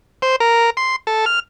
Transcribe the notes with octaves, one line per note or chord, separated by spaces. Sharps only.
C5
A#4
C6
A4
F6